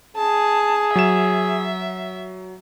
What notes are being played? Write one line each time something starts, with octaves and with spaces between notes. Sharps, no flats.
G#4 A5
F#3 E5 E7